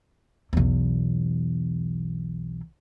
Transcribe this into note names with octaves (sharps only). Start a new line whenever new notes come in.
B1 E2